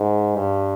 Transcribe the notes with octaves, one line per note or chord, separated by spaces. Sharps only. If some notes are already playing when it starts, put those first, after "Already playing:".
Already playing: G#2
G2